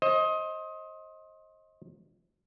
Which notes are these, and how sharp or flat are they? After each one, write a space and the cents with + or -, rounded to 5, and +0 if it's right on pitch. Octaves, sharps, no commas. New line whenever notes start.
C5 +35 D#5 +20